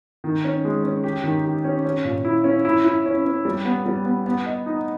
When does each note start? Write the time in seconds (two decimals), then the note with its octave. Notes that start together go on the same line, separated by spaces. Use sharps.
0.24 D#3
0.44 C#4
0.65 G#3
0.83 C#4
1.04 G4
1.24 D#3
1.45 G4
1.64 C#4
1.85 C#4
2.05 A#2
2.25 E4
2.44 C#4
2.65 E4
2.84 E4
3.06 C#4
3.25 C#4
3.45 G3
3.65 B3
3.85 G3
4.05 B3
4.26 B3
4.46 D#5
4.66 D#4